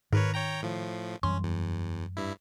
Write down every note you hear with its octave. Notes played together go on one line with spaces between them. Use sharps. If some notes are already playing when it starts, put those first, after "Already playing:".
G#2 D#3 A#4 B4 C#5
C#5 G5 A#5
A2 F3
F#2 E3 G3 C#4 C6
E2
G2 E4